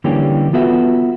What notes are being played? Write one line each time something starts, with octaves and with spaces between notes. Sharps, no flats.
D3 E3 G3 A#3 C#4 G4
B3 F4 F#4 A4 B4 E5